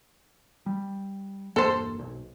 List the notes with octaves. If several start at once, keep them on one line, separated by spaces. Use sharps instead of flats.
G3
E1 G2 A#3 A4 C5
B1